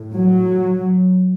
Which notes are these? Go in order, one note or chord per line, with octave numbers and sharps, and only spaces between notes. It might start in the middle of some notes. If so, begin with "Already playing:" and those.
Already playing: A2
F#3